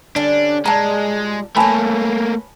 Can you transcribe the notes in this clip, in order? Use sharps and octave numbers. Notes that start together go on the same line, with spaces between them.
D3 G3 C#4 D4
A#2 G3 G#3 A5 A#5
A3 A#3 B4 C#5 G#5 A5 B5